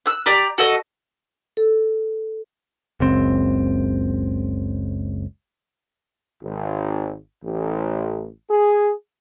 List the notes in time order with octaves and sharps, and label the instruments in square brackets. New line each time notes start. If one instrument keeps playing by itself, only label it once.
[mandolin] E6 F#6
G4 D5 A#5
F#4 A4 D#5
[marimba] A4
[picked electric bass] F#1 C#2 C4
[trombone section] G#1
A1
G#4